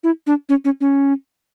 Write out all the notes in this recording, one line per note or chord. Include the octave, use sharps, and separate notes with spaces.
E4
D4
C#4
C#4
C#4